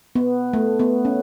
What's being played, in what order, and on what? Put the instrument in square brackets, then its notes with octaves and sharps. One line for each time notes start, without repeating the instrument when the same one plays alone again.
[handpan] B3
A3
B3
C#4